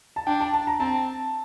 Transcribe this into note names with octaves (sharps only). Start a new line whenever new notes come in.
A5
D4 G5
A5
A5
A#5
C4 A5